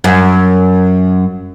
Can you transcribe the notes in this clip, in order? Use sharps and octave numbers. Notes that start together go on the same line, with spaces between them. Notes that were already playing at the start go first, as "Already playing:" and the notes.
F#2